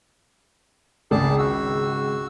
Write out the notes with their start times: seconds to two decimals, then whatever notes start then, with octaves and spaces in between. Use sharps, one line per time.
1.11 G#1 C#2 G#4 D5 A5
1.39 F#4 E6